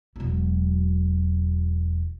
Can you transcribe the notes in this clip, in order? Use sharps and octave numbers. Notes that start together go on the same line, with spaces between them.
E1 F#3